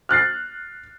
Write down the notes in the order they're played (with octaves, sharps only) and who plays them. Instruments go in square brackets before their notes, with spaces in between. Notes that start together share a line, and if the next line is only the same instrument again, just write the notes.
[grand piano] F6 F#6 A6 C7